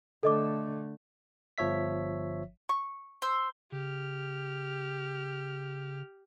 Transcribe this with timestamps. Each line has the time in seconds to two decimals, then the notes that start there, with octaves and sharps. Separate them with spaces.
0.23 D3 A3 A4 D#5 D6
1.58 G1 F3 C#5 E5 B6
2.69 C#6
3.22 C5 E6
3.72 C#3 G4 F6